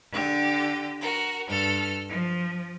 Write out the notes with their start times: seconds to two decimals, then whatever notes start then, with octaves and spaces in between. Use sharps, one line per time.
0.11 D3 G4
1.01 F#4 A#4
1.48 G2 A4 F6
2.08 F3